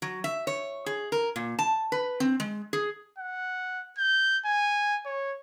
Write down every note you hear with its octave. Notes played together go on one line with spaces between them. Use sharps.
F#3
E5
C#5
G#4
A#4
A#2
A5
B4
C4
G#3
G#4
F#5
G6
G#5
C#5